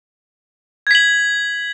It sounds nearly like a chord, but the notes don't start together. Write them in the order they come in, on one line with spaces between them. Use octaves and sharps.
G#6 B6 F#7